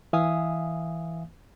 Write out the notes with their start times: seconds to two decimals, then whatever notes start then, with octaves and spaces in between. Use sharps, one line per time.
0.13 E3 E5 F5 G#5 D#6